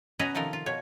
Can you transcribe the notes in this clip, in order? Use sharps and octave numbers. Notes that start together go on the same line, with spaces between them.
B2 C#4 F#4 B4 D#5 A#5
C3 D#3 F3 A4 A#4
F4
B2 C#5